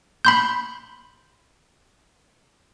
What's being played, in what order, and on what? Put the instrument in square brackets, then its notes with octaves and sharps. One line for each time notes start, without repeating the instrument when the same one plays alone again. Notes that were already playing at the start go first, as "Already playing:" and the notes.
[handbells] B5 C6 G6